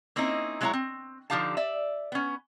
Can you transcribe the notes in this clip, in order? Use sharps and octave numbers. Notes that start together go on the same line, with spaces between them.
A#3 C4 C#4 D#4 E4
F#3 G#3 D4 E4 C#5 A#5
C4
D3 F3 D#4 G4 F5 A5
D5 E5
B3 C#4